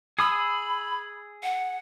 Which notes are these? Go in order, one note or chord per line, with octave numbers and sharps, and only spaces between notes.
G#4 B5 D#6 E6
F#5